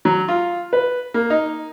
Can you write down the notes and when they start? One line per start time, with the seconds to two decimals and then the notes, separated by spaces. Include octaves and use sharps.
0.05 F#3
0.28 F4
0.73 B4
1.14 A#3
1.30 D#4